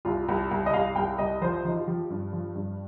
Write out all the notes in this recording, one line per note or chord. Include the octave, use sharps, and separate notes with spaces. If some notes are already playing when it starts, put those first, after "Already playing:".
C2 F4
C2
C2
D#5
C2 F5
C2 G5
C2 D#5
F3 C5
F3 D#4
F4
F3 G4
G2
F3
G2